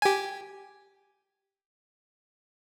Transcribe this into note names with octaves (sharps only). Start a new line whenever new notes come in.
G4 G#5